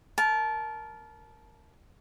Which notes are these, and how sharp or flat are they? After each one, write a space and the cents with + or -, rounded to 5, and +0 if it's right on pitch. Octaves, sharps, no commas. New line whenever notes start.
A#4 +0 A5 -25